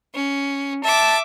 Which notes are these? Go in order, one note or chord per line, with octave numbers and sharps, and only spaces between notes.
C#4
E5 A5 D6